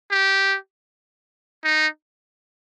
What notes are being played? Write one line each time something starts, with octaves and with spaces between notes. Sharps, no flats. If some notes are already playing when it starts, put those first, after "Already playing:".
G4
D#4